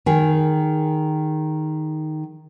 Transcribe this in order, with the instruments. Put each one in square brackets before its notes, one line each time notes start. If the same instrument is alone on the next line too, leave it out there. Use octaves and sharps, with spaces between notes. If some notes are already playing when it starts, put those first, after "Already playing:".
[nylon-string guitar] D#3 G#4